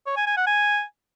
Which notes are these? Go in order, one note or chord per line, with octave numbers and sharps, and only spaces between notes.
C#5
G#5
G#5
F#5
G#5